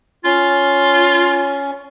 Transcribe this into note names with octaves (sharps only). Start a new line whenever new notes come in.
C#4 F4